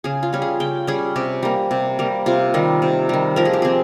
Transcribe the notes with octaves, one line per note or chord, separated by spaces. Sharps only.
C#3 G#4
F4
G3 C#4
G#4
C#3 G5
G3 C#4 G#4
C3 G4
G3 A#3
C3
G3 A#3
C3 F4
D#3 G3
C3
D#3 G3
F3 A#4
G#4
G4
C4 G#4